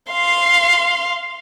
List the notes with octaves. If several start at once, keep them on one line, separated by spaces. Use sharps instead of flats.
F5 C6